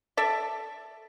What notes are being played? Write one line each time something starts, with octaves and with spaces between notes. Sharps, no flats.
A4 D5 E5